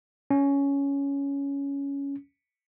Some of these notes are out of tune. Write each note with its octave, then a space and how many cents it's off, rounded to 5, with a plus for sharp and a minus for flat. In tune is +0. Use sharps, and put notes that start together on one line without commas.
C#4 +10